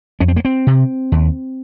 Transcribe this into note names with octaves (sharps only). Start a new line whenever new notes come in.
F2 C#4
C4
A#3
C4
C3
D#2